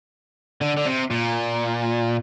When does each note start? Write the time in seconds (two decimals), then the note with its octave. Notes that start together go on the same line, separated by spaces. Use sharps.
0.61 D3
0.77 D3
0.86 C3
1.11 A#2